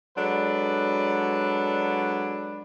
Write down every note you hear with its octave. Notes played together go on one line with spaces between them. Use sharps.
F#3 G#3 D4 A4 B4